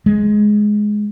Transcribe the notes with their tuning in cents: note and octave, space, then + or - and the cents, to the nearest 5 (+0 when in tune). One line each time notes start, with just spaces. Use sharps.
G#3 +10